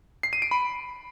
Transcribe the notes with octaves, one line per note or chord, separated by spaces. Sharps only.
C7
D#7
D7
B5